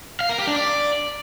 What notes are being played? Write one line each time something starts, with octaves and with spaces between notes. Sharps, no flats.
F5
A#4
G4
D4
D5